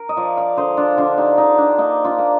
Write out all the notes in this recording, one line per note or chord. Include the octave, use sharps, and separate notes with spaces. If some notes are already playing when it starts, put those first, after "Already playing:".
Already playing: A#4
D#5
F3 D5 F5
D5 F5
D3 C5 D#5
D4 F4
D3 D4 F4
D#4 G4
D3 D#4
D4
A#3 D#4
D4 F4
A#3